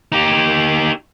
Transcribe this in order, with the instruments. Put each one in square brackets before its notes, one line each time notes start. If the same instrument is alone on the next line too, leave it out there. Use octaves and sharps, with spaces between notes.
[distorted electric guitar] D#4 G4